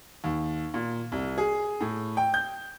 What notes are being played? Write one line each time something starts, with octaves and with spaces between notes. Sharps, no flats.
D#2
A#2
C2
G#4
A2
G5
G6